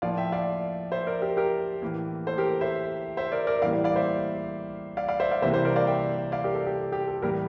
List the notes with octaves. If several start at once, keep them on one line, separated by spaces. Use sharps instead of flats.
A2 F3 A#3 D5 F5
E5 G5
D5 F5
C5 E5
A#4 D5
G4 A#4
G4 A#4
A2 E3 A#3
A4 C5
G4 A#4
C5 E5
C5 E5
A#4 D5
A#4 D5
A2 E3 G3 A#3 D5 F5
D5 F5
C5 E5
D5 F5
D5 F5
C5 E5
D5 F5
C3 E3 G3 A#3 C5 E5
C5 E5
A#4 D5
D5 F5
E5 G5
D5 F5
G4 A#4
A4
G4
G4
A4
A2 E3 G3 A#3 G4 A#4